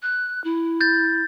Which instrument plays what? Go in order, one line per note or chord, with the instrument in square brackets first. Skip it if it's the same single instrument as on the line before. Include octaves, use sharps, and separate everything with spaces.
[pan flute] F#6
E4
[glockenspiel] G6 A6